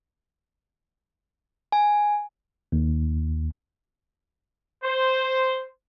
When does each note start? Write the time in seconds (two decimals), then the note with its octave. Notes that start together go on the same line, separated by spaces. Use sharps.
1.72 G#5
2.72 D#2
4.84 C5